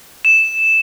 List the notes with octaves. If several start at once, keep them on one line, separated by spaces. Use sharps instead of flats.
E7